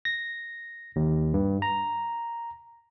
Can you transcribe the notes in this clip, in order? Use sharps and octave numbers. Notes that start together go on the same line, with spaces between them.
A#6
D#2
G2
A#5